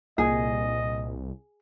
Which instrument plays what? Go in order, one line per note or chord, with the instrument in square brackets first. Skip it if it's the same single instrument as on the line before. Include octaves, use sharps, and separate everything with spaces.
[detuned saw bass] C2 [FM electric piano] A#2 [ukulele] G#4 [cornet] D#5